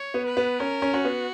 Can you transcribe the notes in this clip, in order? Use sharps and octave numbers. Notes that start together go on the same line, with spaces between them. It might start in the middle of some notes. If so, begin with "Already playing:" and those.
Already playing: C#5
B3
B4
B3
C#4 A#4
C#4
C#4 F#4
B3